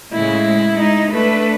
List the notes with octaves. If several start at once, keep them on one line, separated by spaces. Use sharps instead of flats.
A2 C#3 G#3 E4
G#3 D#4
A3 D4 B4